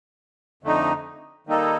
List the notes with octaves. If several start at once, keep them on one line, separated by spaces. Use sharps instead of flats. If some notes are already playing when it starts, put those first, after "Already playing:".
F2 D3 A3 D#4
D#3 G3 A#3 D#4 A4